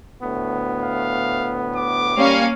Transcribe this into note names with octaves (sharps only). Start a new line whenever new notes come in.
D2 A2 B3
F5
D6
G3 A#3 C#4 F5